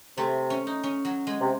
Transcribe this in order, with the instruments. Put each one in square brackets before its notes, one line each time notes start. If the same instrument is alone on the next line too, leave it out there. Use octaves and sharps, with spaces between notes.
[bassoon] C3 [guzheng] A3
[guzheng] C#4
D#4
C#4
F#3
G#3
[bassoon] C3